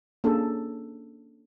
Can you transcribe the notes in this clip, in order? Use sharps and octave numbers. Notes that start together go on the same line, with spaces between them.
A#3 C#4 D4 G#4 A4